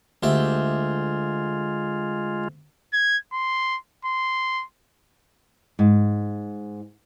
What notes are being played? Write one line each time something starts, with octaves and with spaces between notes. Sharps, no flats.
D2 G#3 F4 G4 E5
G#6
C6
C6
G#2